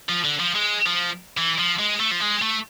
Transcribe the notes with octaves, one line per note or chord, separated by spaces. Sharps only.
F3
D3
F3
G#3
F3
E3
F3
G#3
A3
F3
G#3
A3